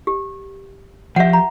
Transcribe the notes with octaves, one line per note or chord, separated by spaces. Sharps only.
G4
F3 G4 E5 F#5
E5 A#5